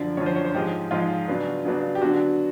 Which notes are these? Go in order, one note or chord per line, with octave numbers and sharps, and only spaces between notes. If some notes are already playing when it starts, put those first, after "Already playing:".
Already playing: F#2 D3 F3 D5
F#2 D3 F3 C#5
C5
C#5
C5
G#2 F3 G#3 G4
G#2 F3 G#3 F4
C#3 F#3 B3 D4
C#3 F#3 B3 D4
G4
D3 F#3 B3 D4 F#4